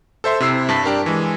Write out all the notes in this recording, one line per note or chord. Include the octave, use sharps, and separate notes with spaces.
A4 C5 E5 C6
C3 E4 E6 C7
G2 A5 B6
D4 G4 A#4
E3 G#3